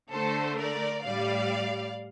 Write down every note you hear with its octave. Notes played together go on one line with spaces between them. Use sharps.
D3 A3 A4 C5
A#4 D5
A2 G3 D5 F5